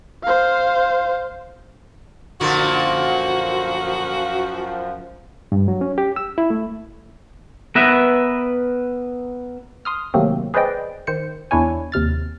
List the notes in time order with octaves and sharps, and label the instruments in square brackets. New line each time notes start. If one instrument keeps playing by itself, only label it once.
[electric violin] C5 F5
[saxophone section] F#2 F3 [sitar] A#2 D3 A#3 [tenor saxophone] F#4
[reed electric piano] G2
F#3
C#4
G4
E6
E4
A3
[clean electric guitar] B3 A#4 B4 E5
[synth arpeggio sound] C6 D#6 F6
C3 D#3 F#3 A3 A#3 C4
G#4 B4 C5 D5 D#5 G5
D#3 C5 C#7
E2 D4 E4 C#5 G#5
D#2 C3 F6 A6